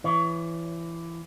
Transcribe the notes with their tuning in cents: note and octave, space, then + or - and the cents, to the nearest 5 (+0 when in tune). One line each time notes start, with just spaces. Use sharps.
E3 +20 C#5 +30